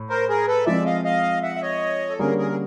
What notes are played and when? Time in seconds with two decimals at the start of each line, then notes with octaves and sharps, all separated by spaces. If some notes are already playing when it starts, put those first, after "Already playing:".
Already playing: A2
0.10 A#4 C5
0.29 G#4 A#4
0.47 A4 B4
0.66 F3 G#3 C4 D5 E5
0.86 D#5 F5
1.04 D#5 F5
1.42 E5 F#5
1.55 E5
1.62 C#5 D#5
2.10 A4
2.19 D3 G3 A#3 C#4 G#4 A#4
2.38 G#4 A#4
2.51 G#4